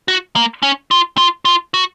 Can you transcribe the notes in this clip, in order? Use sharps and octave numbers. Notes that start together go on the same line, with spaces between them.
F#4
A#3
C#4
F4
F4
F4
F#4